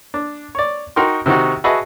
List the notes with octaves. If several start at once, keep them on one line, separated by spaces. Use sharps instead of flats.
D4
C#5 D5
D#4 F#4 A#4 G5 C6
C3 D#3 C4 D#4 F#4
F#4 G#4 B4 D#5 E5 A5